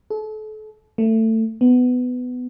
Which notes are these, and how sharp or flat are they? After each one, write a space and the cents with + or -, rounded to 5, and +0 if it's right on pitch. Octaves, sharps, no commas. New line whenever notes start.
A4 -35
A3 +20
B3 +15